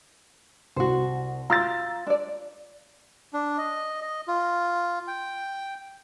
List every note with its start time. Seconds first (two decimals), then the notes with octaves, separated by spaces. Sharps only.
0.76 C2 F#4 C5
1.50 F4 A#5 E6 A6
2.07 D4 D5
3.33 D4
3.58 D#5
4.02 D#5
4.28 F4
5.08 G5